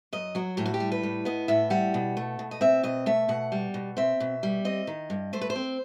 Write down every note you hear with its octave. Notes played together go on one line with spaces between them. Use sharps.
F#2 D#5
F#3 F#4
A2 G4
F#4
G4
G3
B4
A2
B3 D#5
A2 E5
G3 F#5
B2
A3
B2
D#5
C4 E5
B2 D#5
A3 E5
B2 F#5
G3
B2
C4 E5
B2
G3
C4 D#5
D#3
G2
A3 C5
B4
C5
C4